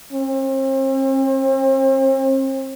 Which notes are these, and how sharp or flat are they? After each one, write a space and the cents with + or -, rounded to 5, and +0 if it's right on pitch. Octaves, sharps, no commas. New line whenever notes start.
C4 +40